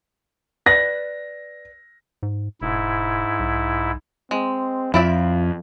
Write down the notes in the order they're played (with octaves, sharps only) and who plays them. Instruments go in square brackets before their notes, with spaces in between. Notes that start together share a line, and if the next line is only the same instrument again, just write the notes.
[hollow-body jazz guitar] B4 D5 F#5 [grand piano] A#6
[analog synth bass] G#2
[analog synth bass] E1 [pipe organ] G#2 E4
[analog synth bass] B1
[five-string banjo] G#3 [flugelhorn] C4
[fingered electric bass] F2 [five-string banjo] E4 D5 E5 [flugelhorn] F4